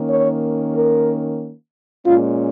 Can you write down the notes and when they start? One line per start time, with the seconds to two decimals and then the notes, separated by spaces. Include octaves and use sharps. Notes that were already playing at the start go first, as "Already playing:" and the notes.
Already playing: D#3 A#3 C#4
0.08 C#5
0.74 A#4
2.05 A#2 G#3 C#4 F4